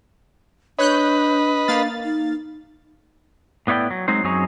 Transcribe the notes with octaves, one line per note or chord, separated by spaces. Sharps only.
D4 B4 C#5 D#5 B5 F#6 G6
A#3 F5 A6
D#4
A2 B3 E4 C#5 D5 G5
F#3
F#3 G#3 C4 D#4 C5
F#2 F#3 C4 D#4 G#4 C#5